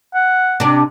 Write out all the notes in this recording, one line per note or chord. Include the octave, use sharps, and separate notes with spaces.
F#5
C3 D4